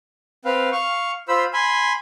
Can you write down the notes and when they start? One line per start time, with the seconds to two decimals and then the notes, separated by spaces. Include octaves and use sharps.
0.45 C4 B4 F5
0.72 F5 C#6
1.28 F4 C5 B5 E6
1.53 G#5 B5 C6